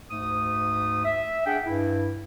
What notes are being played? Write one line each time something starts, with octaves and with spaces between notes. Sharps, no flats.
D2 G#2 A3 D#6
E5
D4 G#4 F#5 G5
G2 E4